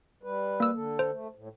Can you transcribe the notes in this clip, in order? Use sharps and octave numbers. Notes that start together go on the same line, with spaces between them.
G3 B4
A#3 E6
D3 A4
C5
A3
A2